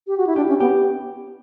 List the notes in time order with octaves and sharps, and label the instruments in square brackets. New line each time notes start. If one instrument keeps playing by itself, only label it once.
[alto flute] G4
F#4
E4
[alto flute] D4 [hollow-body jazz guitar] G4
[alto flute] C#4
[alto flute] B3 [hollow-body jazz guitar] G4